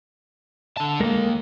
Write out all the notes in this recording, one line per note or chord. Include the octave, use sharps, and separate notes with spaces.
D3 A5
D#2 G#3 A#3 A4 A#4